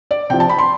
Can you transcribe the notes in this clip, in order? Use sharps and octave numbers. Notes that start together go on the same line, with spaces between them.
D5
C3 F3 G5
A5
B5
C6